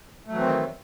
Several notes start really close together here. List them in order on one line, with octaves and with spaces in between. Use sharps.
A3 F#3 E3 C4 D#3